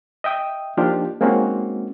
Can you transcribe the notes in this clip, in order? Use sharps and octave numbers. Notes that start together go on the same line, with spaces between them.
D#5 E5 G5 D#6
F3 A#3 D4 D#4 F4 G4
G#3 A#3 C4 C#4 D#4 F#4